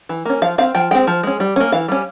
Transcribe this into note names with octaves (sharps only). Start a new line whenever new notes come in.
E3
A#3 C#4
F3 F5
C4 F5
F3 G5
G#3 C4 G5
F3
G#3 C#4
G3
A#3 C#4
E3 F5
G3 C#4